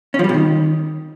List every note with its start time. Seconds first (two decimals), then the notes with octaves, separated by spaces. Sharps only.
0.14 C#4
0.19 F3
0.24 G3
0.29 C3
0.34 D#3